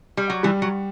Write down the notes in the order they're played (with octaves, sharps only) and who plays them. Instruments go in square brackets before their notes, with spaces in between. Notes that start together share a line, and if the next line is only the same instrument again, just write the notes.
[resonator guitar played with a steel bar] G3
F#3
[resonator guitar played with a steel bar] E3 [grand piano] G3
[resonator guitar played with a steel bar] F#3